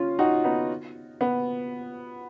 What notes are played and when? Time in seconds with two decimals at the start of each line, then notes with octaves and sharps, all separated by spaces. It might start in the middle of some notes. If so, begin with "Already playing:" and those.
Already playing: C#4 F4
0.19 D#4 F#4
0.44 B3 D#4
1.21 B3